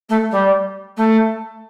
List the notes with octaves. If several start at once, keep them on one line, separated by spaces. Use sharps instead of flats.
A3
G3
A3